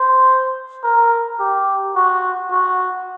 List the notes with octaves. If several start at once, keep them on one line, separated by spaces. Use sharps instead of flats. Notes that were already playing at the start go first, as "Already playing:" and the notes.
Already playing: C5
A#4
G4
F#4
F#4